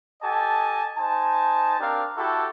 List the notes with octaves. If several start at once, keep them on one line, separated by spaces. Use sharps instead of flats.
G4 A4 D#5 G#5 A5
D#4 C5 G#5 A5
C4 D4 G4 A#4 F5
E4 F#4 G4 A4